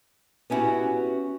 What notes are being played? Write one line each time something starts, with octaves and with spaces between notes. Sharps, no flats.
B3 C#4 D#4 E4 F#4 G4